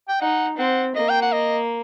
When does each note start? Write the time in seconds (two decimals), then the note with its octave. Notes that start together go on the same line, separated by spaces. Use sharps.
0.09 G5
0.20 D#4 F#5
0.58 C4 F#5
0.96 A#3 D#5
1.09 G5
1.22 F#5
1.32 D#5